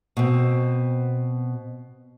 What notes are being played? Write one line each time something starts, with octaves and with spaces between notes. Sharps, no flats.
B2 C4